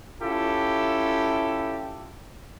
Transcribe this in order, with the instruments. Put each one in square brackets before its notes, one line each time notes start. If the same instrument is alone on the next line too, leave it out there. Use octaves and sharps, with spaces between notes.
[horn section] C#4 E4 F4 G4 A4